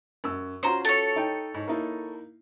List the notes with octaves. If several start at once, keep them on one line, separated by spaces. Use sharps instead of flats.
F#2 E6
C#4 F4 F#4 C5 A#5
A4 C#5
D#4 G5
G#2
A#3 D#4 E4